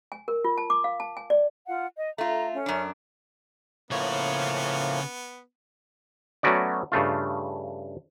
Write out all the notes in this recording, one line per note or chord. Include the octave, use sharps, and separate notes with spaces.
G#5
A#4
F4
A5
D6
F5
A5
G#5
D5
F4 F5 F#5
D#5
A3 F4 A#5
C#4
F#2 D4
A2 C#3 F3 A#3 B3 C#5
F#3 A3 B3 C#4 F#4 D5
G2 C#3 A3 F4